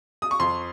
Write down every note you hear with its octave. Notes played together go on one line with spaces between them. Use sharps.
D#6
C#6
F2 C6